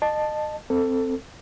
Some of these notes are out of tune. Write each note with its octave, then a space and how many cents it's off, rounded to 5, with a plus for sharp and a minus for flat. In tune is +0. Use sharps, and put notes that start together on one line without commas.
D#5 -30 A5 +0
C4 +0 A4 +15